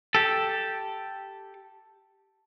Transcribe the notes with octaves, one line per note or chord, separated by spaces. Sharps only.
G4 A4